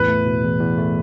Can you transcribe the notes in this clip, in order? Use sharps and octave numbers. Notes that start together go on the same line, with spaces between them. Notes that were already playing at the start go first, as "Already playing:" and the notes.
Already playing: E2 A2 B4
A3
B2
E2
E2
A3